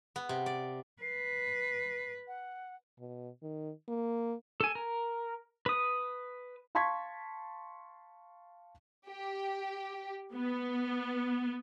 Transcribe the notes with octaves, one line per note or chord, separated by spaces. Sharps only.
B3
C3
D5
B4 C7
F#5
B2
D#3
A#3
A4 G#5
A#4
B4 D#6
F5 A5 C6 C#6 G#6 B6
G4
B3